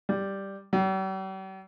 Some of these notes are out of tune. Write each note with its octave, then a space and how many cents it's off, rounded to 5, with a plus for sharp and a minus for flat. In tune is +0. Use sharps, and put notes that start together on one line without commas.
G3 +0
G3 -45